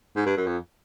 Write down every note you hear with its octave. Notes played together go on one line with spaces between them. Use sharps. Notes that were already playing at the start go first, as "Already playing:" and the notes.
G#2
G2
F#2
F2